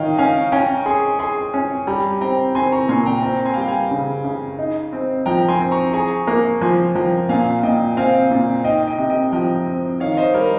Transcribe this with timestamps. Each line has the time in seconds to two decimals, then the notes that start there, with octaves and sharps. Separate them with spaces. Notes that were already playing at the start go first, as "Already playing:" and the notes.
Already playing: D#3 C#5 D#5 F5 G5
0.18 C#4 F5 G#5
0.52 C#4 G5 A#5
0.78 C#6
0.86 G#4 G#5 C6
1.19 G#4 G#5 C6
1.54 C#4
1.87 G3 G5 A#5
2.21 C4 G5 A#5
2.55 C4 G#5 C6
2.72 A#5 C#6
2.88 A#2 G#5 C6
3.06 G5 A#5
3.22 C4 G5 A#5
3.45 G#5 C6
3.54 F5
3.57 G3 G5
3.68 F5 G#5
3.91 C#3
4.25 C#3
4.59 D#4
4.93 C4
5.26 F3 G5 A#5
5.49 G#5 C6
5.60 C4
5.71 A#5 C#6
5.93 G#4 A#5 C#6
6.27 A#3 A#5 C#6
6.61 F3 G#5 C6
6.95 F3 G5 A#5
7.29 A#2 F5 G#5
7.63 A#2 D#5 G5
7.97 C4 F5 G#5
8.31 A#2
8.64 D#4 D#5 G5
8.87 D#5 G5
8.98 C3
9.10 D#5 G5
9.32 F3 G5 A#5
9.66 C4
10.00 D#3 C#5 F5
10.17 C5 D#5
10.34 G3 A#4 C#5